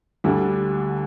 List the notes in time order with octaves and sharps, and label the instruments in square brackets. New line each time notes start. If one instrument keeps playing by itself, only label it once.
[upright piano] D2 D3 G3 D4